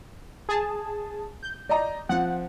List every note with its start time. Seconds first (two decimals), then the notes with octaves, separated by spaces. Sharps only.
0.49 G#4 A5
1.43 G6
1.69 D5 D#5 A#5
2.09 F3 C4 F#5